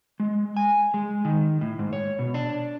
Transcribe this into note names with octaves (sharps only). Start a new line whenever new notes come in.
G#3
G#5
G#3
D#3
A2
G#2
C#5
B2
D4